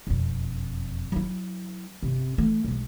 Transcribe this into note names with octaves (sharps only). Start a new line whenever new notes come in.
E1 F2
F#3 E4
G1 C3
E3 A3
B1 G#3